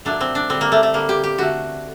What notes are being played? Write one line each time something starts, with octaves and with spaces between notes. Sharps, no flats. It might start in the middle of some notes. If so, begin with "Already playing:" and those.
A#2 F#3 A3 D4
C4
D4
D3 G3 C4
A#3
A3
A3
D3 G3 A#3
G4
G4
D3 A3 F#4